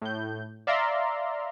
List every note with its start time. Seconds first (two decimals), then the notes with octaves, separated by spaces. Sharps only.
0.02 A2 G6
0.67 D5 E5 F5 A#5 C6